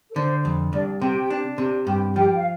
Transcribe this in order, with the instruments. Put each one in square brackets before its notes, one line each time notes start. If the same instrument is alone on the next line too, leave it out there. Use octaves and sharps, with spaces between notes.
[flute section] A4
[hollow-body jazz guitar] D3 [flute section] C5
[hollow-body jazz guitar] F2
[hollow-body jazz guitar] C2 [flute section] D4 D5
[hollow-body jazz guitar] C3 [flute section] G4 G5
[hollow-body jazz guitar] D4
C3
[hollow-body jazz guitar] G2 [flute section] G4 G5
[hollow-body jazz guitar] F3 [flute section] G4 G5
[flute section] F5